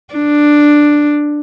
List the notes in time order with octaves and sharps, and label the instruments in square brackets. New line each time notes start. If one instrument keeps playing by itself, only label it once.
[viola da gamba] D4